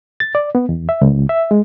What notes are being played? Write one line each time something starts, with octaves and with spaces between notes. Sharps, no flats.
A6
D5
B3
E2
E5
C#2
E5
G#3